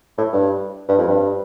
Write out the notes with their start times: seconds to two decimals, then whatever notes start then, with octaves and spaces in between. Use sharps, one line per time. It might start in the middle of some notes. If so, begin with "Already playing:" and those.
0.18 A2
0.33 G2
0.89 G2
0.98 F2
1.08 G2